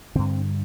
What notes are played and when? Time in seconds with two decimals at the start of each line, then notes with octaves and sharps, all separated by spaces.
0.15 G2 D3 C4